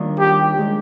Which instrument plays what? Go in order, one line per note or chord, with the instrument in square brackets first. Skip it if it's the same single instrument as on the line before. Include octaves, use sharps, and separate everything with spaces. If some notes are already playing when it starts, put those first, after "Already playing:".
Already playing: [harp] D#2 D#3 G3 D4 F4
[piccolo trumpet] G4
[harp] D#3 G#3 D4 G4